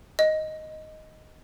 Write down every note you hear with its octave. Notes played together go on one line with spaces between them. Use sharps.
D#5